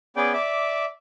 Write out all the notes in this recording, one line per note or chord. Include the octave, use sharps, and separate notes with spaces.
B3 C#4 G#4 D5 G5
D5 E5 D6